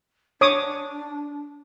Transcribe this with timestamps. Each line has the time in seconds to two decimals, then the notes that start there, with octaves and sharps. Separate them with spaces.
0.41 D4 C#5 D6 D#6